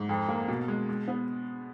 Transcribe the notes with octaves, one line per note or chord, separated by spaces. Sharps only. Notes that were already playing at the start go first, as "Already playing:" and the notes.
Already playing: G#2
F2
A#3
B2
G#3
G#3
B3